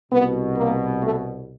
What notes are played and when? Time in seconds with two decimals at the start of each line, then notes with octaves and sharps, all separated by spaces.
0.11 C2 B2 B3
0.57 A#3
1.01 A3